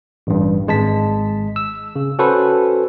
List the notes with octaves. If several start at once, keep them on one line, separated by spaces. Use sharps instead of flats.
A1 G2
G#1 G#3 A5 B6
E6
C#3
C#4 F#4 A4 B4 C5